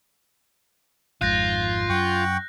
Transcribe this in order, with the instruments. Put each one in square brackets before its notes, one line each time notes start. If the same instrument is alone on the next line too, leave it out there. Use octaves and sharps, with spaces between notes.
[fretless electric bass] G#1 F2 G#2 [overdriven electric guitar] F4 [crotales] F#6 G6 A#6
[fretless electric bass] F#2 [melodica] F#5 G5 C#6